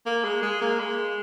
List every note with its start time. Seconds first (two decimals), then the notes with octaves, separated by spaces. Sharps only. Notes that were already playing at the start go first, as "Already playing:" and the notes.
0.06 A#3
0.24 G#3
0.42 G#3
0.61 A#3
0.80 G#3